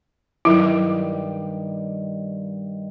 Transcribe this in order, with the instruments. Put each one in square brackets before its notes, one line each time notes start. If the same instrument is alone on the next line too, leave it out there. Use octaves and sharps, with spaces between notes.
[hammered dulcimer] G2 D#3 G3 [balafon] F#3 E4